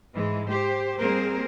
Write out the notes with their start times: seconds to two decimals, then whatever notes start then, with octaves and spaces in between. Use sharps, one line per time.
0.14 G#2 E3 G#3
0.49 G4 C5
0.99 G3 A#3 C4 G#4 A#4 C5